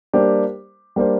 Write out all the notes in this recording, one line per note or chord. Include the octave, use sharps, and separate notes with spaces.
G3 A#3 D4 G4 C5
G3 A#3 D4 G4 C5